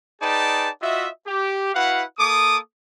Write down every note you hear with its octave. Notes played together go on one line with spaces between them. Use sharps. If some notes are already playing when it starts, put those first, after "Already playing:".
D#4 G#4 B4 D5 G5 A5
F4 F#4 D#5 E5
G4
E4 F#4 B4 F5 F#5
A#3 A4 D6 D#6